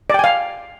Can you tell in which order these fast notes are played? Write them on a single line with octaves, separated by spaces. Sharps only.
D5 G5 G#5 F5